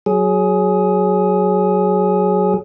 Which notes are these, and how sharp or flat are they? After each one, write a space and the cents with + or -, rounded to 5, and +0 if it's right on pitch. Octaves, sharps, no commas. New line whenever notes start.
F#3 +0 G#4 +15